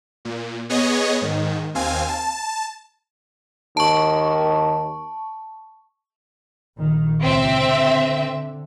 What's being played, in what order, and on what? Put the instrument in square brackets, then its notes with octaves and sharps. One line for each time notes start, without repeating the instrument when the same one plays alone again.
[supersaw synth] A#2
B3 G#4 C#5 D#5
G#2 D#3
D#2 C4 F5 G#5
A5
[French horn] D#2 [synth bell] A5 C#6
[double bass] A#1 D#3
[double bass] C#2 A#2 [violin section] C4 E5
[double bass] D3